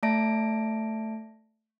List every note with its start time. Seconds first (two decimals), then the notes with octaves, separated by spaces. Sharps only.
0.03 A3 D5 E5 A5 A#6 D7